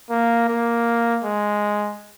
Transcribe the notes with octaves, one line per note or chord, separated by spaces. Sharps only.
A#3
A#3
G#3